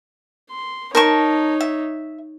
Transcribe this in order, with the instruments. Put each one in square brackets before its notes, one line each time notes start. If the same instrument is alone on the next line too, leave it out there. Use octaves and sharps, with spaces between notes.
[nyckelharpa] C6
[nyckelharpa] D#4 C#5 [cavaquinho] A#4 A5 C#6
[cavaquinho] E5